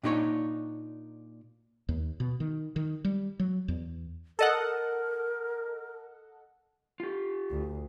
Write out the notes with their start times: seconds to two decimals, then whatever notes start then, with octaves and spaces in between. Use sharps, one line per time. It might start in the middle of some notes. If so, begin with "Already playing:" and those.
0.03 A#2 D4 D#4 G4 C#5
1.89 D#2
2.20 B2
2.40 D#3
2.76 D#3
3.04 G3
3.39 F#3
3.68 E2
4.39 A4 A#4 D#5 F#5
7.00 F4 G4
7.51 D2